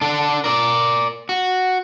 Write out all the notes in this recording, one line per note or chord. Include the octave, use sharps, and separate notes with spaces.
D4 A4
A#4 D5
F#4